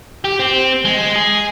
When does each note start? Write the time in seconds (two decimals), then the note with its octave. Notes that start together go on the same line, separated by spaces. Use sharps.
0.25 G4
0.39 C4
0.85 G#3
1.16 G#4